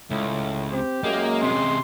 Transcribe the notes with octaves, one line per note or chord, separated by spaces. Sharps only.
C#2 A2
C4 G4
F#2 G#3 A#3
C3 C#4 C6